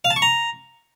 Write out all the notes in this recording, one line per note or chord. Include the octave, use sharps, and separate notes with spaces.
F5
A5
C#6
A#5